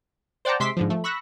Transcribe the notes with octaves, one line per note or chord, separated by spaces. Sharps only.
C5 D5 F#5 G5 A5 A#5
C3 G#3 E5 C6 D6 B6
G#2 D3 F3
F3 A3
B5 C#6 E6 F#6 A#6